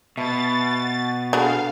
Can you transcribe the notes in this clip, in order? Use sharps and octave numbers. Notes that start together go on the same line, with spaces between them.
B2 E5 A5 B5 A6
F#5
B3 D4 F#4 G#4 A4 F5 A5